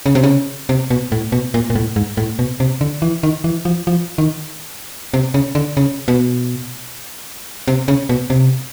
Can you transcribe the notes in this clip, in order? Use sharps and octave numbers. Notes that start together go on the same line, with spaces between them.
C#3
C3
C#3
C3
B2
A2
B2
A#2
A#2
A2
G#2
A2
B2
C3
D3
E3
D#3
E3
F3
F3
D#3
C3
C#3
D3
C#3
B2
C3
C#3
B2
C3